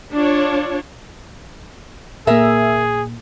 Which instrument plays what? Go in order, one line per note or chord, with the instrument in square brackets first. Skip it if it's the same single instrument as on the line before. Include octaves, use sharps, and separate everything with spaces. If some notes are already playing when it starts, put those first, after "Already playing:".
[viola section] D4 F4 C#5
[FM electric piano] A#2 A#3 [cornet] G#4 [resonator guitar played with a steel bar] A#4 E5